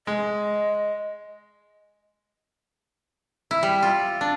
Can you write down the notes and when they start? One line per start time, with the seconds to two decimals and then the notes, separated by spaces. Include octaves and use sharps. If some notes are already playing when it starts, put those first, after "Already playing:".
0.07 G#3 D#5
3.51 E4
3.63 G3
3.83 F4
4.21 D4